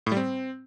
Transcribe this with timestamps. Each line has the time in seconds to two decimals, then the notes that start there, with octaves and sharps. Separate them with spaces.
0.07 A2
0.12 G3
0.17 C4